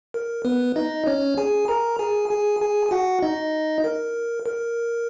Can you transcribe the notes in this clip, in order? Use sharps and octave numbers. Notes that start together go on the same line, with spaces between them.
A#4
B3 B4
D#4 D#5
C#4 C#5
G#4 G#5
A#4 A#5
G#4 G#5
G#4 G#5
G#4 G#5
G#5
F#4 F#5
D#4 D#5
A#4
A#4